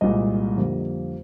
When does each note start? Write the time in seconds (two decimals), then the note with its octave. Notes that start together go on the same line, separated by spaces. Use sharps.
0.01 C2 A#2 G#3 D#5
0.57 F2 D3 G3 A#3